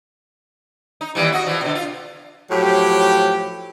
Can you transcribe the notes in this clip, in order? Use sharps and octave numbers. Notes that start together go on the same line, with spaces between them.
D#4
D#2 E3 G3
F#4 D#5
E3 F3
B2 D3
F4
A2 F3 F#3 G4